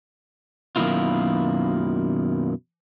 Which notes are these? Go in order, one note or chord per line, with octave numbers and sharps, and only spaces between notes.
F#2 B2 D#3 A#3 E4 F4